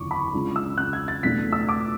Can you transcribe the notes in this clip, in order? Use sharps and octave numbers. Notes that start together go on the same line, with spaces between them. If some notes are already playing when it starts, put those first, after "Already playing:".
Already playing: F#1 E2 D3 C#6 D6
B5
C#2 C#3 G#3 D4
E6
F#6
G#6
A6
E2 B2 A3 D4 B6
E6
D6